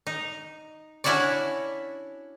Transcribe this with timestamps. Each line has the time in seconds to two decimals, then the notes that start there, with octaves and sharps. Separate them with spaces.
0.07 D#4
1.04 C#4 D4 E4 F#4 C#5 D5